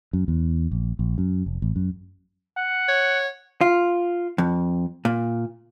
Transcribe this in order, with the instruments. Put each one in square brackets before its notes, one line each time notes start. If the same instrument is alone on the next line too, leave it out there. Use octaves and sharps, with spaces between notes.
[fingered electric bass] F#2
E2
A#1
A#1
F#2
F1
A1
F#2
[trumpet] F#5
[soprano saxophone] C#5
[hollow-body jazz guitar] F4
F2
A#2